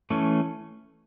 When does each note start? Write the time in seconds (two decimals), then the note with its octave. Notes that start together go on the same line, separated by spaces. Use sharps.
0.10 E3 A3 C#4